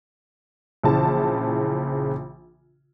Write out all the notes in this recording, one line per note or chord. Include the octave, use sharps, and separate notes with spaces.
A#1 C#3 E3 A5